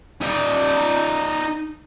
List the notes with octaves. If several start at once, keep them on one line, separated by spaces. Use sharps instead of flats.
D#4 D5